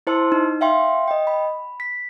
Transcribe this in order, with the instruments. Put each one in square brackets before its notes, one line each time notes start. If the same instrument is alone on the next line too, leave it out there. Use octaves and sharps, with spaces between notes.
[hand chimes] E4 C5 A5 C6 E6
D#4
E5 F5 G5 C6
D#5 G5
B5
B6